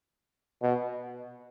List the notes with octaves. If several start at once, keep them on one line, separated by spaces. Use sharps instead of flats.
B2